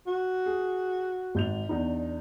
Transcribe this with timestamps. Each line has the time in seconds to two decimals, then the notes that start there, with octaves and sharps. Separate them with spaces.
0.07 F#4
0.46 G#4
1.35 G#1 G6 F7
1.69 E2 D4 D#4